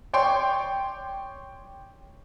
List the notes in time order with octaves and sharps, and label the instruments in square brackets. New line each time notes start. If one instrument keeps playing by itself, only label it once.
[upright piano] C#5 D5 G5 C6